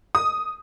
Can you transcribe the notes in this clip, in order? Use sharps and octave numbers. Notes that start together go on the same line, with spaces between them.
D#6